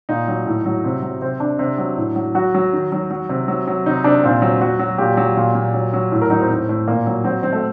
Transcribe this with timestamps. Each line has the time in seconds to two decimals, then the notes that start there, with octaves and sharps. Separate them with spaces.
0.09 A#2 D#4
0.28 F#3
0.46 A2
0.66 F#3
0.84 C3
1.02 F#3
1.21 C3 C4
1.40 C3 D4
1.59 C3
1.78 F#3
1.97 A2
2.16 F#3
2.35 F#3 F#4
2.54 F#3
2.73 D#3
2.92 F#3
3.11 F#3
3.29 C3
3.48 F#3
3.67 F#3
3.86 C3 D#4
4.04 C3 D4
4.24 A#2 C4
4.42 F#3
4.61 F#3 F#4
4.79 F#3
4.98 A#2 G4
5.17 F#3
5.37 A#2
5.55 A#2
5.74 F#3
5.93 F#3
6.12 A2
6.22 A#4
6.30 F#3 D#4
6.40 C4
6.50 A2
6.69 A2
6.87 A#2 A#3
7.07 F#3
7.24 F#3 C4
7.43 F#3 C4
7.53 A3